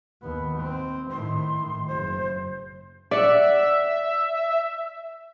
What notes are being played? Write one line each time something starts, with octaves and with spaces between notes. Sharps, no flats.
D#2 B3
C4
A2 D#3 C6
F#1 C5
D5 E5 F#5